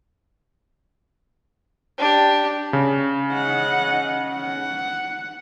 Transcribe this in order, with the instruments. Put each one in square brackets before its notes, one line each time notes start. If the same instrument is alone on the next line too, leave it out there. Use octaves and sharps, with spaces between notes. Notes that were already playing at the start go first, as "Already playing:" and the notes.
[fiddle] D4 G4
[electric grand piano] C#3
[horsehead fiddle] D#5 F#5
F#5